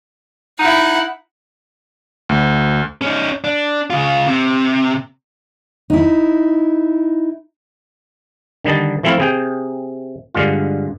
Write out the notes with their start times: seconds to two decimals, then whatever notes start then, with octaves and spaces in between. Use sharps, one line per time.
0.59 D#4 E4 F#5
2.29 D2
3.02 C#4 D#4
3.44 D4
3.90 C#3 F4
4.27 C3
5.90 D#4 E4
8.64 D3 D#3 G3 D#5 A5
9.03 E3 F3 A3 C4 E4 F4
9.20 C3 G#4 G5
10.35 G2 D3 G#3 F4